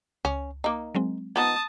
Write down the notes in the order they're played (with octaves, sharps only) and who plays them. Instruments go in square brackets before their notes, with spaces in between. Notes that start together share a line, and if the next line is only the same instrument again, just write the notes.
[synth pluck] C#2 [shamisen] C#4
[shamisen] A#3 D#4
[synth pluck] F#3 G#3 C4
[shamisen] F3 B3 D#4 [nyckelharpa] A5 D#6